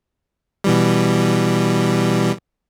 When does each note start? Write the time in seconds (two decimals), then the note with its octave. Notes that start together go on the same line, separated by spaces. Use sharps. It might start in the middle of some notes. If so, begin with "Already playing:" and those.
0.64 B2 E3 G3